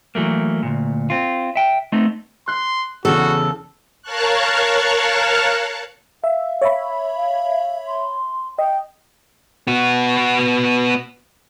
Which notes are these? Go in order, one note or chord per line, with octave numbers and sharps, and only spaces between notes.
E3 F#3 A3 A#3
D2 A#2
C4 F4
E5 G5
A3 B3 C4 D#4
C6 F#6
E2 C#3 F#4 A4
A#4 C#5 F5 A5 C#6 F#6
E5 F5
C#5 E5 B5
F5
C6
D#5 G5
B3 F#4